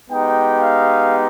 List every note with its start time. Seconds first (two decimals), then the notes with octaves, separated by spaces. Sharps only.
0.10 G#3 B3 D#4 G4 G5
0.62 F5